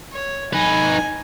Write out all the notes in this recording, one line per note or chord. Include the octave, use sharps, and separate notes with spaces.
C#5
D#4 B4 G#5